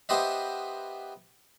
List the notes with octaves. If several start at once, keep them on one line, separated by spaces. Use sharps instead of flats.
B3 G4 C5 D#5 E5